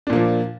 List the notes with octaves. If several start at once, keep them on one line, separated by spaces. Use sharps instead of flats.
A#2 F3 A#3 D4